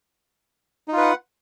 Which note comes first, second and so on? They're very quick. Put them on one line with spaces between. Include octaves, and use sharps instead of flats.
D#4 F4 B4 F#5